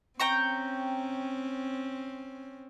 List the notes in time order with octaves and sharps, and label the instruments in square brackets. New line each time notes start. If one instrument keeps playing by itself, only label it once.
[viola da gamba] C4 C#4 [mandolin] G5 A#5 C#6